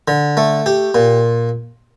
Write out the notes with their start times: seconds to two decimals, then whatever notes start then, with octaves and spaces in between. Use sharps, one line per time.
0.08 D3
0.37 A3
0.66 G4
0.95 A#2